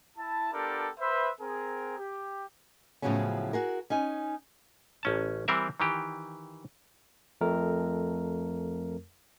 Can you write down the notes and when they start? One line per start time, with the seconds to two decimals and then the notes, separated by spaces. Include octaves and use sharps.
0.18 E4 A5
0.53 B3 D4 F4 G4 A4 A#4
0.99 B4 C5 E5
1.41 C4 G#4 A#4
1.98 G4
3.02 A2 C#3 F3 F#3 B3 C#4
3.53 F#4 G#4 A#4
3.90 C#4 D#4 G#5
5.03 A1 C#4 A5
5.48 E3 G3 C4 A#4 E5
5.80 D#3 E3 G4
7.41 F2 A3 A#4